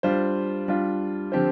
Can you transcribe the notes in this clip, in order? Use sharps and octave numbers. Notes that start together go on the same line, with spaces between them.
G3 D4 F4 C5
G3 D4 F4
D3 F3 C4 G4 C5